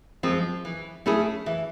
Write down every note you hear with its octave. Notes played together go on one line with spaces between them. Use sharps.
F3 G#3 C4
E3
A3 C#4 E4 G#4
E3